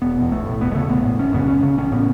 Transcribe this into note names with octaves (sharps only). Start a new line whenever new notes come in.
E1 B3
E2 B2
B1 A3
A2
E1 B3
G#3
E2 C#3 A3
A1 B3
A2
G#1 C#4
F#2 C#3 B3
C#2 C#4
C#3
A1 C#4
A2 B3